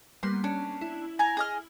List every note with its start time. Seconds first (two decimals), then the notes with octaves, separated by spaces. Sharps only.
0.23 G3 A#3 B3 C6
0.44 C#4 D4
0.81 E4
1.19 G#5 A#5
1.37 G#4 D#5 F6